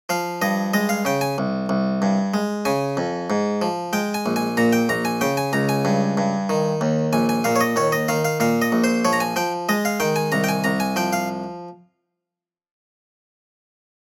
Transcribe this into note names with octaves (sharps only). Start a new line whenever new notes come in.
F3 F5
G2 D#5
G#3 D#5
F5
C#3 G5
G#5
C2
C2
G2
G#3
C#3 G#5
F2
G#2
F3
G#3 G5
G#5
A#1
G#5
A#2 A#5
G5
A#1 A#5
G#5
C#3 G5
G#5
C#2 A#5
G#5
G2
G2
D#3
D#2
A#1 G#5
G#5
A#2 F5
C#5
D#5
D#2 C#5
D#5
D#3 F5
F5
A#2 F5
D#5
A#1
C5
F3 C#5
A#5
G#5
F3 G5
G#3 D#5
F5
D#3 G5
G#5
C2 A#5
G5
G#5
C2 A#5
G#5
F3 G5
F5